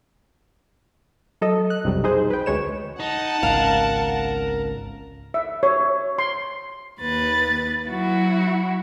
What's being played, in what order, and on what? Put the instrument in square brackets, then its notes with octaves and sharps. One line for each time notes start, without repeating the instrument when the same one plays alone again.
[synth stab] F#3 A4 D#5
F#6
B1 F2 C3 F#3 G3
D#4 G#4 C5
B4 G5
D2 G#3 C#5 E7
[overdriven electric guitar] D#4 [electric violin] F#5 A5
[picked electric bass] G#1 C#2 [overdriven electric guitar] A#4 [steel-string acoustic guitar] F5
[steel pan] E5
C#5
C6
[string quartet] D#2 B4 A6
F#3 E4 F#4